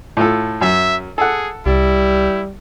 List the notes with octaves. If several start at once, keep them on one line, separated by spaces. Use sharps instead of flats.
A2 F4 A4
F#2 E5
G#4 A4 F#5
C2 G3 E4